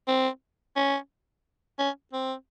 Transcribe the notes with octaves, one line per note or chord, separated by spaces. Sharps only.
C4
C#4
C#4
C4